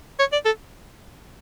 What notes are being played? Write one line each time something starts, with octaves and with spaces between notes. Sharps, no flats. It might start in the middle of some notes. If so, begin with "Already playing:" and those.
C#5
D5
A4